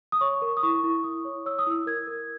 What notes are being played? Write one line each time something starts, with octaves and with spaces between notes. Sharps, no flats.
D#6
C#5 C#6
A#4
D#6
E4 C#6
E4
E4 D#6
C#5
C#5 E6
D#6
E4 E6
A#4 G#6
A#4